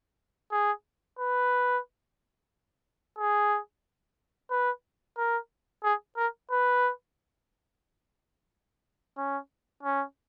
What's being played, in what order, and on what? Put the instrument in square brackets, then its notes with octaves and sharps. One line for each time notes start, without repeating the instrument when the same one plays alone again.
[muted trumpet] G#4
B4
G#4
B4
A#4
G#4
A#4
B4
C#4
C#4